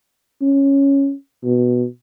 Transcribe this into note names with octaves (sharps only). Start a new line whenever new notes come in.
C#4
B2